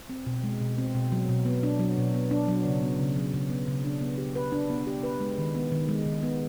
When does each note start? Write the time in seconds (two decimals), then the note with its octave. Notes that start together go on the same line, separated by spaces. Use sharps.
0.10 C4
0.26 B2
0.44 G#3
0.61 B2
0.78 C4
0.95 B2
1.12 F#3
1.29 B2
1.46 B3
1.63 D4
1.79 F#3
1.97 B2
2.14 B3
2.31 D4
2.48 F#3
2.65 C#3
2.82 B3
2.99 C#3
3.16 F#3
3.33 C#3
3.50 B3
3.68 C#3
3.84 D4
4.01 B3
4.18 G4
4.35 B4
4.52 D4
4.70 B3
4.87 G4
5.03 B4
5.20 G#3
5.38 D#3
5.55 B3
5.72 D#3
5.89 G#3
6.06 D#3
6.23 B3